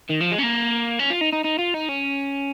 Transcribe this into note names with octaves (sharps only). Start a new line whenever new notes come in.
D#3
F3
G#3
C#4
A#3
C#4
F4
D#4
D#4
D#4
F4
D#4
C#4